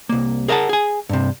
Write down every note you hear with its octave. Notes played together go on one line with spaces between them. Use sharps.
C2 A#3
G#4 A#4 D#5 E5 F#5 A5
G#4 G#5
G2 C3